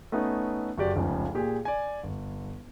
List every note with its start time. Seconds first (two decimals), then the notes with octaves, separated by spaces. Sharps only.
0.12 A3 B3 C#4 D#4
0.78 F#1 F#4 G4 D5
0.96 F1 C#2 C#3 F3
1.34 A#2 G4 G#4
1.65 D5 G#5
2.03 G1